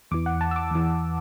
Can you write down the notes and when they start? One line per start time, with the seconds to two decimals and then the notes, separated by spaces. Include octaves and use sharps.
0.11 E2 E3 D6
0.26 F#5
0.41 A5
0.51 E6
0.56 D6
0.71 E2 E3